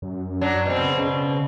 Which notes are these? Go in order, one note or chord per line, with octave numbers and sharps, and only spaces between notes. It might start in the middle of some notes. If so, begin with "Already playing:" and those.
F#2
F#3 D4
B2 C4
C#3